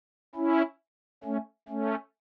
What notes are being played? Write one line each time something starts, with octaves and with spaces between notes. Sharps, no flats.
C#4 E4
A3 C#4
A3 C#4